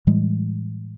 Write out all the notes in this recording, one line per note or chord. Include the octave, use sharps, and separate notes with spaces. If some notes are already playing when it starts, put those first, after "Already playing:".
A2 E3 G3 G#3